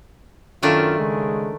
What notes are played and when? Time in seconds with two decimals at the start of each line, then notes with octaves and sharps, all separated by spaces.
0.63 F#2 D#3 A3 C#4 D4 F4
0.98 C#3 G#3